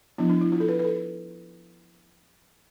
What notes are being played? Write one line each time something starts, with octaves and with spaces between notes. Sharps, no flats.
F3 B3 D4 E4
D4
E4
F4
A4
B4
B4
A4